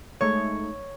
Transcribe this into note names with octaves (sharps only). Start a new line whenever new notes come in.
G#3 A3 D#4 C#5